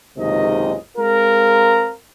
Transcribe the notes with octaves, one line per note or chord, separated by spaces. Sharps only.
F#1 C#2 C3 D#3 G#3 D#5
G#3 C4 F4 A#4